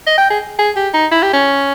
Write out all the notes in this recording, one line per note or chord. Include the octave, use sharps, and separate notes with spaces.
D#5
G5
G#4
G#4
G4
D#4
E4
G4
C#4